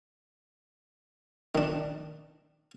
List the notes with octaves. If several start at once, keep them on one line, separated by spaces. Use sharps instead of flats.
D#3 D4